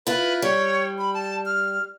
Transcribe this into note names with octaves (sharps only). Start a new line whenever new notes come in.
E4 F4 B4
G3 C#5
B5
A5
F6